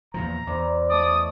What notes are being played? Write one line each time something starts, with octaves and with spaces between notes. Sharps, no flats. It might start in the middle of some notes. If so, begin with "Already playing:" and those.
E2 A#2 F3 A#5
E2 C5 D5 D6
D#3 A3 C#5 D5 D#6